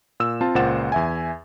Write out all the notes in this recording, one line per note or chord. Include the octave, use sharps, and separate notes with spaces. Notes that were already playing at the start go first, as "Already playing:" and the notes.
A#2 E6 E7
C4 F4 A5
C#2 A#2 C5 F#5 A6 E7
E2 E5 G#5